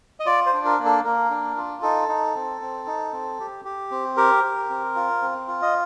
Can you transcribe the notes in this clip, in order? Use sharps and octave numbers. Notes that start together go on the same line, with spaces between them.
D#5
F4 D5
C5
D4
A#4
A#3
A4
A#3 A#4
D4
F4
D#4 A4
D#4
C4
C4
D#4
C4
G4
G4
C4
G4 A#4
G4
C4
F4
C4
F4
D#5